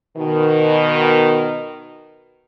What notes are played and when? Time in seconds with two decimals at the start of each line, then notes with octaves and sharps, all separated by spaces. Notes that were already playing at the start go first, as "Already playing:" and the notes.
0.16 B2 D#3